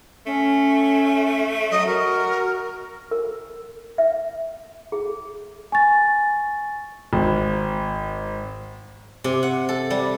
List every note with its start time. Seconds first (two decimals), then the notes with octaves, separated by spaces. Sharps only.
0.26 A3 C#4
1.71 F#3 D#5
1.87 F#4 A#4
3.11 A#4
3.98 E5
4.92 G#4
5.72 G#5 C#6 A6
7.13 G#1
9.24 C3
9.43 F#5
9.69 A4
9.90 G3